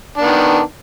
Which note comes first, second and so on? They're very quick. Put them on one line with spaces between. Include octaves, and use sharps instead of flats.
D4 B3 D#3